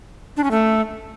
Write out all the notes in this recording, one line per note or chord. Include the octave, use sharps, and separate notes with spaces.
D4
C#4
A3